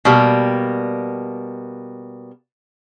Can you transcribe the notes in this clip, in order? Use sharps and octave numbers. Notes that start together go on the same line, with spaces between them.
B2 G3 A#3